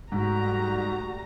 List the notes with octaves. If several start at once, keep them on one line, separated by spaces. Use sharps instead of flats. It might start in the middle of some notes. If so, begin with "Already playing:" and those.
G#2 G3 A3 F#4 A#5